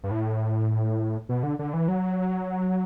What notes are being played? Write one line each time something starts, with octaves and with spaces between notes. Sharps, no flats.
G2
A2
B2
D3
D3
E3
F#3